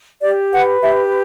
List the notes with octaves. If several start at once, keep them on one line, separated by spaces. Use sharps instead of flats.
G4 D5
B4 F#5
G4 E5